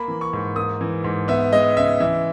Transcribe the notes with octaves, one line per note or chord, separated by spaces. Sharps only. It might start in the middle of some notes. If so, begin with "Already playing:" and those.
Already playing: A#3 B5
E3
C#6
G#2
A#3 D#6
E3
G#2
B3 E5
G#3 D#5
C#3 E5
E3 E5